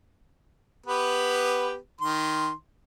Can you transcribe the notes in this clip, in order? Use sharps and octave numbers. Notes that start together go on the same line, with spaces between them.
B3 G4 B4
D#3 C6